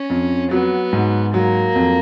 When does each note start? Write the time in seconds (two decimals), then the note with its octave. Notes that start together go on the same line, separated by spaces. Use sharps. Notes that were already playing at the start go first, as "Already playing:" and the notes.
Already playing: C#4
0.10 F2
0.51 F#3 B3
0.93 G#2
1.33 F#3 A#3
1.75 F2